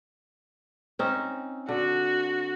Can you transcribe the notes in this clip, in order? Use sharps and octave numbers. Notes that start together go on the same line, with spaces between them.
C4 C#4 D#4
D3 F#4